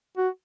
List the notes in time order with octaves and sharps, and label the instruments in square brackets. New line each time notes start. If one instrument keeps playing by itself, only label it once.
[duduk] F#4